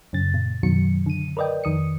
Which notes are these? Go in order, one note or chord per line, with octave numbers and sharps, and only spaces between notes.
F#2 C#3 A6
A#2
F#2 B2 D#3 F#3 C#7
D3 D#7
A#4 B4 D5 D#5 G5
F2 D#3 D#6 C#7